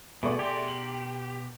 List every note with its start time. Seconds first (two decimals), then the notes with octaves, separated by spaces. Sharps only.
0.23 B2 A3 G#4 D5
0.39 B2 G4 C6
0.68 F#7